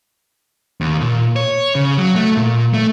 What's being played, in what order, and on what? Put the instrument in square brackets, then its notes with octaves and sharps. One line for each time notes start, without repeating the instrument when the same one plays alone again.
[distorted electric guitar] D#2
A#2
C#5
C#3
F#3
A3
A#2
A3